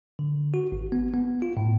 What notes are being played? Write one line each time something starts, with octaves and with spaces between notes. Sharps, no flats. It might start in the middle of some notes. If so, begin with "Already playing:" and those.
D3
F#4
G#1
B3
B3
F4
A2